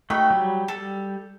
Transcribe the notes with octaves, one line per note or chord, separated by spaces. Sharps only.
A3 D#4 F#4 G5 B5
F#3 G3
G3 A4